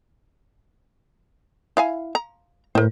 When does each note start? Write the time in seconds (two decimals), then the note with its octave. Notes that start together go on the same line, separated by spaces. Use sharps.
1.77 E4 F5 G#5
2.15 A#5
2.75 A2 A#4 C5